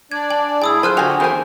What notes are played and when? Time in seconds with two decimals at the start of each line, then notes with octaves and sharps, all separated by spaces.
0.11 D4 D5 G#6
0.30 G#5 F#7
0.62 A2 E4 G#4 G#5 D#6 E6
0.83 F#3 F4 G#4 C5 A5 F6 F#6
0.97 D3 F#4 G4 G#5 F7
1.20 E2 D#4 A#4 C5 G#5